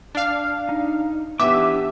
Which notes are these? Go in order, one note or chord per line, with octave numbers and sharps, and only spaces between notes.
D4 F5
D#4
E3 B3 D4 G4 E5 D6